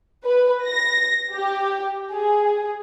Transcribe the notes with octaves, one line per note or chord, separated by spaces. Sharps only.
B4
A#6
G4
G#4